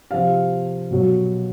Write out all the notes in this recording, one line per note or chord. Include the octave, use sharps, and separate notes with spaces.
C3 F3 F5
B2 F#3